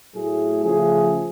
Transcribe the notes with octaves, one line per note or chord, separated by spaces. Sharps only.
A2 F#3 A3 G#4
C#3 F3 A3 G#4